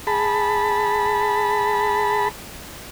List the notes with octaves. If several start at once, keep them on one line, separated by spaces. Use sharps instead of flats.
G#4 A5 B5